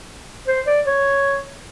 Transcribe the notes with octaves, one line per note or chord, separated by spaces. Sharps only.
C5
D5
C#5